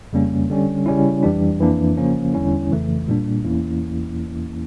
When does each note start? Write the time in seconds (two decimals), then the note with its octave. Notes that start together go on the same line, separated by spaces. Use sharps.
0.13 F2 C#3 G3 A#3 C#4
0.50 D3 G3 C#4
0.86 C#3 G3 C#4 E4
1.23 F2 E3 G3 D4
1.60 F2 E3 A#3 D4
1.97 C#3 F3 A#3 C#4
2.34 E2 D3 G3 C#4 E4
2.71 F2 C#3 E3 A3
3.08 A#2 G3 A#3 D4
3.44 E2 E3 A#3 C#4 E4